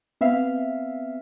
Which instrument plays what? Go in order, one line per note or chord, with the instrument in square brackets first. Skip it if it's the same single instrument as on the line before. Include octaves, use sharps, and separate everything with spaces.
[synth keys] B3 C4 E5 F5